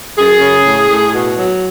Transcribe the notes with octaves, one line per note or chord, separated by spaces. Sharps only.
F#2 G#4
C#3
A2
A2
B2
F#3